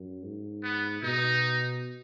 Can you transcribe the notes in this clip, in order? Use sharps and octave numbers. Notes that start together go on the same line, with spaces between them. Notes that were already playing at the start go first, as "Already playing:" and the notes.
Already playing: F#2
G#2
B3
B2 D#4